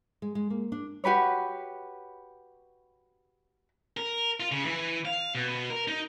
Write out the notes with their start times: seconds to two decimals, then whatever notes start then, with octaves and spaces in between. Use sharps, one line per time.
0.22 G#3
0.35 G#3
0.50 A#3
0.72 D4
1.04 F#4 G4 B4 C#5
3.97 A#4
4.40 F4
4.52 C#3
4.65 E3
5.05 F5
5.35 B2
5.70 A#4
5.88 D#4